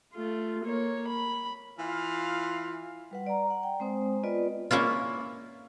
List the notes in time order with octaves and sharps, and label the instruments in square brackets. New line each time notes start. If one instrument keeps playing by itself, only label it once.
[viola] A3 F4
A#3 C#5
B5
[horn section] E3 F5 [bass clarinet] F4
[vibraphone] G3 B4 F#5
D5 A#5
F#5
G5
G#3 C4 C5 D#6
B3 F4 B4 D5 D#5
[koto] A#3 C#4 E4 F4